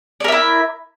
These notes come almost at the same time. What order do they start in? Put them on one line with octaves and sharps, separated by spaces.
D5 A#4 E5 E4